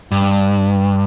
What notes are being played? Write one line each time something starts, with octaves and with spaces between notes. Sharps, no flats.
G2